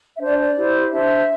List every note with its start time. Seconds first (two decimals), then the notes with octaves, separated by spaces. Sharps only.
0.18 D4 E5
0.22 C5 D5
0.41 D5
0.55 E4 G4 C5
0.92 D4 C5 E5